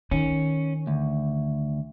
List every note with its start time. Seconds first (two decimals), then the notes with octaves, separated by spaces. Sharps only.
0.11 D#3 C#4
0.87 D2